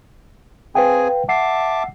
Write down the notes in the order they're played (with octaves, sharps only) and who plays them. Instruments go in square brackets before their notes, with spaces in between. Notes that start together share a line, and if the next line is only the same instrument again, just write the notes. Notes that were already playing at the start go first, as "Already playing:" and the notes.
[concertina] C4 G#4 G#5 [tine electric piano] B4 F5 G5
[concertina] E5 A5 D6 [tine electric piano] F#5 C7